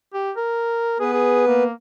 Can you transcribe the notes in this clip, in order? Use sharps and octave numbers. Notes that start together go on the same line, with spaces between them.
G4
A#4
B3 G#4 B4
G#4
A#3